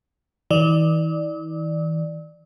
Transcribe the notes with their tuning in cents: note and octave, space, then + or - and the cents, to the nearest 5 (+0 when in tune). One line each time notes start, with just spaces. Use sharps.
E3 -45 D5 +10